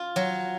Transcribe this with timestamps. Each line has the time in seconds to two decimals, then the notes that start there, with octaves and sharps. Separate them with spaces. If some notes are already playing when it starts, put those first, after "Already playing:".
Already playing: F4
0.16 F#3